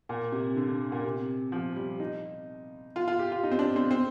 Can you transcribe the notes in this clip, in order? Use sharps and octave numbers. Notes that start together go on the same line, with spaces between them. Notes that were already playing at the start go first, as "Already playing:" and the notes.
A#2
C3
D3
D3
A#2
C3
F3
G3
D#4
F4
F4
G4
F4
D#4
C4
D4
C4
C4